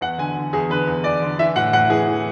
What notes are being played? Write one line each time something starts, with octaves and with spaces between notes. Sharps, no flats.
E2 F#5
D3 G#5
D3
E2 G#4
D3 B4
E2
E2 D5
D3
E3 E5
A2 F#5
A2 F#5
E3 G#4
E3